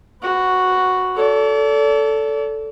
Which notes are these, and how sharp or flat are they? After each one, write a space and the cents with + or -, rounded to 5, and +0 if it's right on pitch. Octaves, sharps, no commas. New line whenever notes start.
F#4 +0 B4 +30
A4 +0 D5 -40